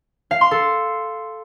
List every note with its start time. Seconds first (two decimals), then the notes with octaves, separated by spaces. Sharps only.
0.31 F5
0.41 C6
0.51 A4